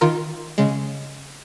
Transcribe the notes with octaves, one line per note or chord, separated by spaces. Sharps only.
D#3 F4 A#4
C#3 G#3